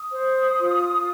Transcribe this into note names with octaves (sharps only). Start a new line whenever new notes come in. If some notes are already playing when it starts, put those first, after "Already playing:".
Already playing: D#6
C5
F4